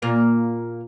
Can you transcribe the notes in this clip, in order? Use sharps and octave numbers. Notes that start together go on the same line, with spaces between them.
A#2 A#3 F5